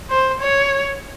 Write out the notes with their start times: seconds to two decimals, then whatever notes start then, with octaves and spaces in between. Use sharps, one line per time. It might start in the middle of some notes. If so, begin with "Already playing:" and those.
0.10 C5
0.40 C#5